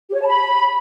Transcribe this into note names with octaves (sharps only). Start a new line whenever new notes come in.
G4
C#5
A5
B5